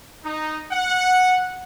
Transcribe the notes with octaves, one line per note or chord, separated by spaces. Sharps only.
D#4
F#5